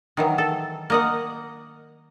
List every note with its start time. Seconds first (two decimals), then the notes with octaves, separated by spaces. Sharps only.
0.17 D#3 E3 F#3
0.38 A4
0.90 A#3 D#5 F#5